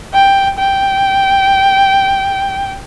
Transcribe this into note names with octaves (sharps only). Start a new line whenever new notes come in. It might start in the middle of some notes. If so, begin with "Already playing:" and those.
G5
G5